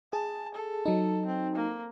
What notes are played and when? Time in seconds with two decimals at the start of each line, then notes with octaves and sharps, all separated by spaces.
0.13 G#4 A5
0.55 A4
0.86 F#3 D#4
1.26 C4
1.56 A#3